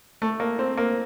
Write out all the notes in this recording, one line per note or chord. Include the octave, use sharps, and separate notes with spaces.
A3
A#3
C4
A#3